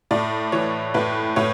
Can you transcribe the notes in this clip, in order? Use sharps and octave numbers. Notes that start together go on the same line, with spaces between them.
A2 D5
E3 C#5
A2 B4
A2 C#5